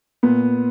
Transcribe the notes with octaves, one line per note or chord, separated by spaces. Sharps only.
A#2 B3